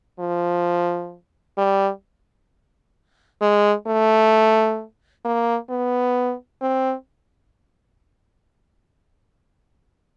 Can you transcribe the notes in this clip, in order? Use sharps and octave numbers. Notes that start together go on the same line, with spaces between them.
F3
G3
G#3
A3
A#3
B3
C4